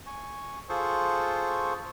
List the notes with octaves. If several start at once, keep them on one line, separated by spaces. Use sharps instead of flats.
G#5 C#6
F4 G#4 A4 C5 C#6